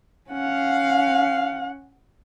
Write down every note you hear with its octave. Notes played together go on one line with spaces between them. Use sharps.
C#4 F5 F#5